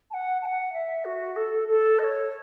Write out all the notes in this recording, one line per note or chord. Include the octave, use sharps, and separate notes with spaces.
A5
F#5
A5
F#5
E5
F#4
A4
A4
D#5
C#5